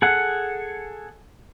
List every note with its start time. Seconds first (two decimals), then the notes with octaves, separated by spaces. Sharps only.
0.02 G#4 A4 F#5